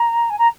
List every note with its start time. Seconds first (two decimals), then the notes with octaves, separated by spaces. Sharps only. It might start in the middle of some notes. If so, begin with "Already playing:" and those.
Already playing: A#5
0.30 G#5
0.38 A#5